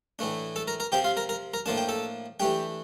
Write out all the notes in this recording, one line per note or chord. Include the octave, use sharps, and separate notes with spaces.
A2 E3 A3 D4
A4 A5
A#4 A#5
A#4 A#5
C3 F3 C4 G4 G5
F4 F5
A#4 A#5
A#4 A#5
A#4 A#5
A2 F3 A#3 D4 A5
G5
A4 A5
E3 A3 D4 G4 G5